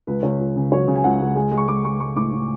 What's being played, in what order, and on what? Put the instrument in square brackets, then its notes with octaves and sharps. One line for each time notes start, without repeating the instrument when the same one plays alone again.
[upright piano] C#2 B4
C#2 C#5
C#2
C#3
F#3 C#5
C#3
G#5
C#2 F#5
C#2
G#3 G#5
G#3
C#6
G#3 D6
G#3 C#6
G#3 C#6
A2 D6
A2